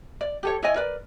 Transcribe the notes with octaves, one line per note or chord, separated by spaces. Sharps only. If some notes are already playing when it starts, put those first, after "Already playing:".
D5
G4 A4 C#5
E4 C#5 D#5 G#5
A#4 B4 D5